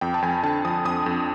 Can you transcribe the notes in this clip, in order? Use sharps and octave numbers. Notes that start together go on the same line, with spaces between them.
F2 G5
A5
F2 G#5
D3 A5
F3 D#6
F2 D#6
F2